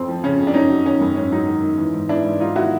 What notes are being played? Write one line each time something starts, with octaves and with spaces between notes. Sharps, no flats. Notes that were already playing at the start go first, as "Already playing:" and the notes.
Already playing: F2 C4
F3
C#3 C#4
F2
D4
F#2 C#4 D#4
F#3
D#3 C#4
F#2
G#2 C#4
F#3 C#4 D#4
D#3
G#2
E3
G#2
E3 D4 E4
G#2
F#3 D#4 F4
D#3 E4 F#4